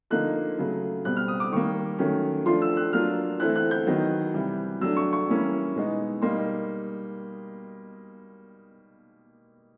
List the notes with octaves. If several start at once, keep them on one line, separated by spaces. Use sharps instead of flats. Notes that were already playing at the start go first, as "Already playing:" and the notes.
D3 F3 A#3 D#4 F#6
C#3 F#3 A3
B2 G3 C4 F#6
F6
D#6
D6
D#3 G3 A#3 C#6
D#3 F#3 A3 C#4
F3 A3 D4 F4 C6
E6
F#6
F#3 A#3 D4 F4 F6
E3 A3 C4 E4 F#6
F#6
G6
D#3 F#3 B3 D#4
C3 E3 G3
F#3 A3 D4 E6
C#6
C#6
E3 G3 A#3 C#4 E4
B2 G#3 B3 D#4
B2 G3 A#3 D#4 C6